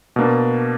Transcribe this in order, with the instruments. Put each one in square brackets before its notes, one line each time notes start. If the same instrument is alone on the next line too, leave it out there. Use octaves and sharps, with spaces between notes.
[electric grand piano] B2 A#3 D4